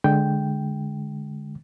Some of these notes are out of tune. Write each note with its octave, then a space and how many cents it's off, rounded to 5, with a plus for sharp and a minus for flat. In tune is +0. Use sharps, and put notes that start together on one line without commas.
D3 +0 G#3 +5 G5 +0